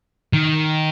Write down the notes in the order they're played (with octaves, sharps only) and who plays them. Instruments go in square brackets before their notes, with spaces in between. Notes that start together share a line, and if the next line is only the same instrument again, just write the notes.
[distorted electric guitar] D#3